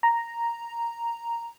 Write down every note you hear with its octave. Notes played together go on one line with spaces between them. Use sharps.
A#5